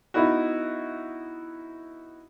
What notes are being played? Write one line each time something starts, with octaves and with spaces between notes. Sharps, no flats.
B3 D#4 E4 F#4